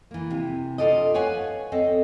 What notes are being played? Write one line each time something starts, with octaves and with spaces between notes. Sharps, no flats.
E3 A#3
C3
G2 F4 A4 D5 D#5
B4 C#5 F5 F#5 G#5
C4 A4 D#5